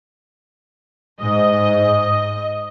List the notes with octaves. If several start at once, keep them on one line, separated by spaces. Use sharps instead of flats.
G#2 D#5